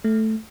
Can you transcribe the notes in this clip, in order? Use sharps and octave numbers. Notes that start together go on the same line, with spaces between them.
A3